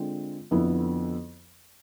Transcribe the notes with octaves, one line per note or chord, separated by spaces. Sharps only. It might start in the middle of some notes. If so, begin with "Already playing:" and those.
Already playing: D3 G#3 C4 F4
F2 D3 F3 B3 E4